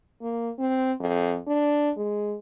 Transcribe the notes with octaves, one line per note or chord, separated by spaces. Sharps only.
A#3
C4
F2
D4
G#3